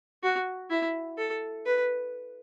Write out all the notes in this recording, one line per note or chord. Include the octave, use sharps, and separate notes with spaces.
F#4
E4
A4
B4